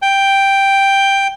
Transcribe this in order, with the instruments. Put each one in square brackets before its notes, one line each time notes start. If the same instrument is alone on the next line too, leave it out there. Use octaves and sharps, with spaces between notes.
[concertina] G5